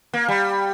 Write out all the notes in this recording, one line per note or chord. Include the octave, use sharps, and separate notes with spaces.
A#3
G3